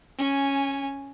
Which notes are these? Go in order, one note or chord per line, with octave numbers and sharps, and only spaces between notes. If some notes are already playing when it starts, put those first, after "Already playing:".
C#4 G#5